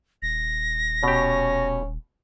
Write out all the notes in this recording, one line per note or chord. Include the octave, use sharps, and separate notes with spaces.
D#1 A#6
B2 C#4 G4